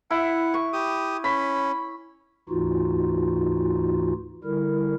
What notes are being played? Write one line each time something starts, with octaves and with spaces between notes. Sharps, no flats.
E4 F#5
C#6
G4 D#6
C#4 B5
D2 G#2 E3 D#4 F4 F#4
D3 G3 E4 A#4